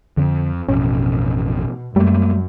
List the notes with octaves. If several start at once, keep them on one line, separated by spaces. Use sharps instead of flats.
F2 D3
A1 F2 B2 C#4
F#2 G3 A3 A#3